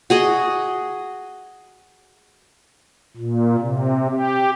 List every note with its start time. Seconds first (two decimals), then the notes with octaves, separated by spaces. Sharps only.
0.10 F#4 G#4 D#5
3.17 A#2
3.58 C3
4.10 G4